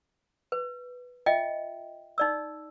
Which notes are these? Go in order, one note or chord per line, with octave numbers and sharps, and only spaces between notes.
B4
F4 D#5 E5 G5
D#4 D5 E6